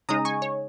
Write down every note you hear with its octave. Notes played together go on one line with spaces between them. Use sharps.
C#3 G#3 D#4 A#5 D#6
G#5 C#6
C#5